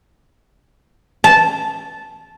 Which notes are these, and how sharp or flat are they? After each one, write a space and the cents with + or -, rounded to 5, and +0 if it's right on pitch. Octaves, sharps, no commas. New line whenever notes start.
A5 -10